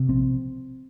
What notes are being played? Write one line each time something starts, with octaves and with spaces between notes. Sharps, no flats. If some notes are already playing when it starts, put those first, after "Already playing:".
Already playing: C3
A#1 C4